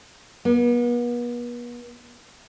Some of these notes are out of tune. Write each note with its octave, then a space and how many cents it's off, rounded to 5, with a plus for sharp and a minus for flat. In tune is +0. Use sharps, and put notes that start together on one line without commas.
B3 -40